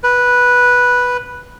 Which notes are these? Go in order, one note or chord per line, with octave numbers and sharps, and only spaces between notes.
B4